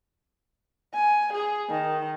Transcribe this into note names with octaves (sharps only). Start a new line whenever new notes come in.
G#5
G#4
D#3